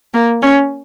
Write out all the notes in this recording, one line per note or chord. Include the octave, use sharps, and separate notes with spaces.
A#3
C#4